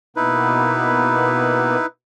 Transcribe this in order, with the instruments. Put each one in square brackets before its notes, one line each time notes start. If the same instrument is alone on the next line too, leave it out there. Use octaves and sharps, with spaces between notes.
[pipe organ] B2 A#3 B3 [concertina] D#4 E4 B4